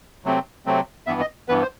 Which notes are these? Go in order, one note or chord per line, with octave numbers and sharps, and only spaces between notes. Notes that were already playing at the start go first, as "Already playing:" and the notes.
C3 F#3 A3 C4
C3 F#3 A3 C4
G2 E3 B3 E5
D#5
G2 E3 B3 B4
C5